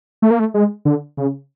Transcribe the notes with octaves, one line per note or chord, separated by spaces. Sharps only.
A3
A#3
A3
G#3
D3
C#3